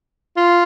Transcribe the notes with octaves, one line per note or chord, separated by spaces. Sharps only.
F4